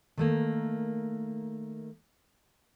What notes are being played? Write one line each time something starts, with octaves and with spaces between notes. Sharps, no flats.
D#3 A3 A#3